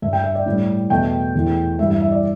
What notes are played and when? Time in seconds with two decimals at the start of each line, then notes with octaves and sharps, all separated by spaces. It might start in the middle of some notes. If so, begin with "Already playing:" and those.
0.02 G2 G3 E5
0.13 G5
0.24 E5
0.35 D5
0.46 A2 G3
0.90 E2 B2 A3 G5
1.35 E2 E3 A3
1.79 G2 E3 G3 E5
1.90 E5
2.01 E5
2.12 D5